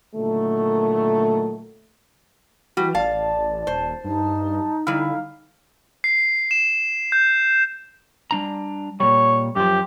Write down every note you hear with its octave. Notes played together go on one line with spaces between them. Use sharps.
A#2 D3 D#3 F#3 A3
E3 G3 F#4
A1 D5 F5 A5
D#1 C5
G2 D#4
D3 G3 E4 F5
C7
E7
G6
G3 D4 A#5
A#2 G3 C#5
F#2 F3 G4